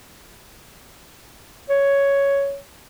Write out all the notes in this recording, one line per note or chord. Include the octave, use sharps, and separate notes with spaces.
C#5